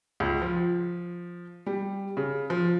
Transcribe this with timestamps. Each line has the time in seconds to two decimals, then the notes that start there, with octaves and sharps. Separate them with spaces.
0.20 C#2
0.42 F3
1.66 G3
2.17 C#3
2.50 F3